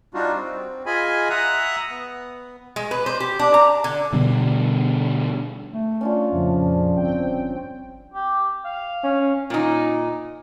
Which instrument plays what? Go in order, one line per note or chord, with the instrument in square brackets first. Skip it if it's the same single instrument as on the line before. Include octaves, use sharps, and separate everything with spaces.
[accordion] G3 D4 D#4 F4 F#4
C4
F4 G#4 D#5 G#5 B5
E5 F#5 A#5 D#6 F#6
B3
[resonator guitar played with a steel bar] G#3
B4
C5
G4
D4
A#5
D3
[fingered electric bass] B2 D3 G3
[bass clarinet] A3
[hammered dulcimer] C#4 D4 F4
[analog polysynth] F2 A#2 C#3 [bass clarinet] F3
[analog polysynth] G1 C4 G5
[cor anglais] G4
F5
[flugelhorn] C#4
[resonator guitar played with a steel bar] A#2 D#4